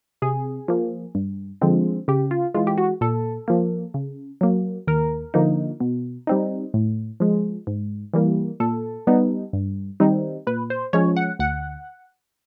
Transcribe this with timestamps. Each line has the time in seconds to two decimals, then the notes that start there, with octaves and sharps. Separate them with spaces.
0.22 C3 G#4
0.68 F3 A#3
1.15 G2
1.61 D3 F3 G#3 C4
2.08 C#3 G4
2.31 F4
2.54 E3 G#3 F4
2.67 G4
2.78 F#4
3.01 A#2 A4
3.48 F3 A#3
3.94 C#3
4.41 F#3 A#3
4.87 D#2 A#4
5.34 D3 F3 A#3 D#4
5.80 B2
6.27 G3 C4 D#4
6.74 A2
7.20 F3 G#3
7.67 G#2
8.14 E3 G3 A#3
8.60 A#2 A4
9.07 G3 B3 D#4
9.53 G2
10.00 D#3 G3 C4 D#4
10.47 A#2 B4
10.70 C5
10.93 F3 G#3 C#4 C#5
11.17 F#5
11.39 D2 F#5